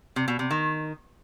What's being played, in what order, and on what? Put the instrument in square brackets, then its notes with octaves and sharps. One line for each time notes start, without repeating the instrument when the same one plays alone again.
[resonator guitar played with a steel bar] C3
B2
C3
D#3